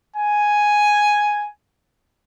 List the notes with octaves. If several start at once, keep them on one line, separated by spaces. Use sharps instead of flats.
G#5